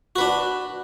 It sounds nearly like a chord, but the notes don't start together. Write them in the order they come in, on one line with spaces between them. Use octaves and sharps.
F#4 B4 D4